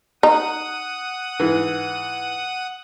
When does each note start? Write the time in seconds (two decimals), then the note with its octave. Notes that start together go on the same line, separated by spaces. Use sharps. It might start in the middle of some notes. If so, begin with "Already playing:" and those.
0.23 D#4 F#5 D#6
1.40 G#2 E3